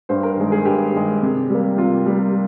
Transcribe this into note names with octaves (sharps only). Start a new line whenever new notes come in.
G2 C5
A#4
D#3 G#3
G#4
G2 G4
D#3 G#3
C3
G3 A#3
C3 F4
G3 A#3